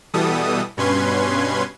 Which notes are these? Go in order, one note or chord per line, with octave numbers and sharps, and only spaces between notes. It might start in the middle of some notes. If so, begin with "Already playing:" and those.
B2 E3 G3 B3 A4 D#6
G2 B2 C#4 B4 C6 G#6